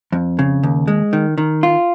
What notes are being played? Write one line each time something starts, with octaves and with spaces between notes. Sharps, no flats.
F2
C#3
D#2
G#3
D#3
D#3
F4